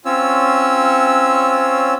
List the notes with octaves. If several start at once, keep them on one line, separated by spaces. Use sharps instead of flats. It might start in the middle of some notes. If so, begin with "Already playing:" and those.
C4 C#4 F4 C#5 E6